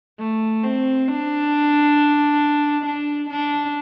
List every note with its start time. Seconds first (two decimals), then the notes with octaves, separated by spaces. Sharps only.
0.19 A3
0.63 C4
1.08 D4
2.85 D4
3.30 D4